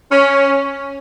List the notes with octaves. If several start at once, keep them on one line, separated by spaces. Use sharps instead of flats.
C#4